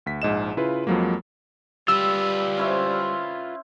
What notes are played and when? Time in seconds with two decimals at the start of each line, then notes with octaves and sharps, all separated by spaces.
0.06 D2 B6
0.22 A#1 G#2 D#5 E7
0.57 C#3 E4 F4 B4
0.87 F2 F3 F#3 G#3 A#3
1.88 G3 F4 B4 E6
2.57 C#4 E4 C5